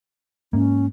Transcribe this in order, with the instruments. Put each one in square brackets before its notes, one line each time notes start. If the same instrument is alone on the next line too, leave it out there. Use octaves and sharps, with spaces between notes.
[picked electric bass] G#2 A#3 [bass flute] C#4